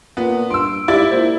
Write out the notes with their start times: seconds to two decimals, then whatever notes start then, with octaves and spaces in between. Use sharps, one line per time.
0.17 A#2 B3
0.50 G2 C6 E6 D7
0.88 G#2 E4 G4 D5 A6
1.11 A#2 C5